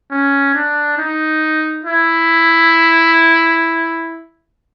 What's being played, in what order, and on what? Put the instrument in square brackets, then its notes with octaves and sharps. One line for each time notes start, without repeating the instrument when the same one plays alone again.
[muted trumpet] C#4
D4
D#4
E4